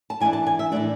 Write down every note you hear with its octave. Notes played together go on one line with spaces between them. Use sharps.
A5
E3 B3 D4 G#5
A5
G#5
E5
A2 E3 A3 D4 D5